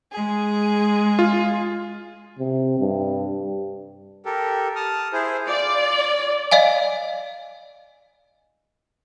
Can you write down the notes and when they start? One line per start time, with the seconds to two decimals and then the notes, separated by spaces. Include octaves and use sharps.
0.13 G#3 G#4
1.19 F4
2.39 C3
2.80 G2
4.25 G4 A4 A#4
4.76 A5 D#6 F6
5.13 E4 G#4 C5
5.48 F4 D5
6.51 D5 D#5 F5 G#5